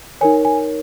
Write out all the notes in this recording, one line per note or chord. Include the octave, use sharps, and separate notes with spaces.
D#4 A#4 C#5 G#5
G#5